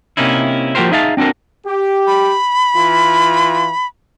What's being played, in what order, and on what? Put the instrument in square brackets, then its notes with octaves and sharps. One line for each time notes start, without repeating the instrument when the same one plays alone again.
[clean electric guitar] C3 A#3 C#4 D#4 E4
F3 A#3 F#4 G4 A#4 C5
D#4 G#4 E5 F5 G5 A5
C4 D4 F#4 A4 A#4
[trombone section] G4
[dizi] B5
[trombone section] E3 F4